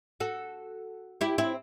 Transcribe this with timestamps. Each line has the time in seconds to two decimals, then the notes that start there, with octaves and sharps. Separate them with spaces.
0.20 F#4 A4
1.21 E4 G4
1.38 C4 E4